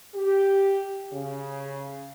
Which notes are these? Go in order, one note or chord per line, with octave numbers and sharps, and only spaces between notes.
G4
C#3